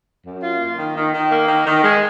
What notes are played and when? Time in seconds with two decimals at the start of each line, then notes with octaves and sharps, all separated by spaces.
0.25 F#2
0.42 F4
0.59 A#3
0.77 D#3
0.96 D#3
1.13 D#3
1.31 A#3
1.48 D#3
1.66 D#3
1.83 G#3